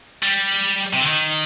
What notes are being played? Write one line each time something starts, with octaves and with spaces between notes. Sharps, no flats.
G3
C3
D3
D#3